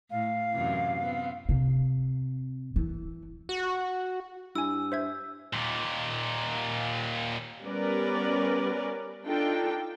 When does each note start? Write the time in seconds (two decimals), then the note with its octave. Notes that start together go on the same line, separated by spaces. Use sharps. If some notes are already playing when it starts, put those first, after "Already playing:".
0.11 A2 F5
0.51 F#2 C3 E3
1.02 B3 C4
1.49 C3
2.76 E3
3.49 F#4
4.55 G2 E4 G#5 E6
4.92 C5 E5 G#6
5.53 D#2 A#2
7.63 G3 B3 C#4 A#4 B4 D5
9.25 D4 D#4 F4 A4 G5